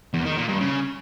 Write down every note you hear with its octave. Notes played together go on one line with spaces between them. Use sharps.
E2
D#3
A#2
G2
C#3